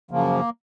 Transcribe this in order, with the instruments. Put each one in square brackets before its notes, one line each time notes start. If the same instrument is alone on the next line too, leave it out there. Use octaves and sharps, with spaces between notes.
[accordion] F#2 C#3 F3 A#3